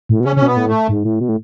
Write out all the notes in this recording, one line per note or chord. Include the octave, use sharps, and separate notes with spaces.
A2
B2
C#3 C#4
C#3 C#4
B2 B3
A2
A3
G#2
A2
B2
A2